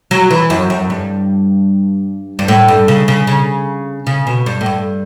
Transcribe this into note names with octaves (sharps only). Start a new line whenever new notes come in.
F#3
E3
F#2
F#2
G2
G2
A2
G2
C#3
C#3
C#3
C#3
B2
G2
A2
G2